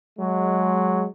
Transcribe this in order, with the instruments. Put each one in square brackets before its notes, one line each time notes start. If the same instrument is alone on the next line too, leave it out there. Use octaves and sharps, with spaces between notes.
[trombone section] F#3 G#3